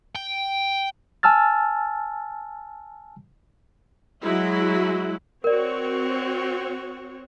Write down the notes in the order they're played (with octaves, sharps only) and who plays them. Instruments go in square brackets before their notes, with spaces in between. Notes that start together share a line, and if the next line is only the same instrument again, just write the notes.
[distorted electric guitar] G5
[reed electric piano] G#5 A5 E6 F6 A6
[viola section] F#3 G#3 E4 F#4
[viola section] C4 F#4 C#5 [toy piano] A#4 D5